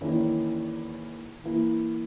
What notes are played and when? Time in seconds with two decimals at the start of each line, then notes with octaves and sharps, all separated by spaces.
0.01 E2 D#3 A#3 C#4 E4
1.44 E3 A#3 E4